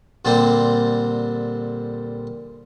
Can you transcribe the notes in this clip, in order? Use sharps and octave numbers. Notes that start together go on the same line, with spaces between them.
A#2 D3 G3 C4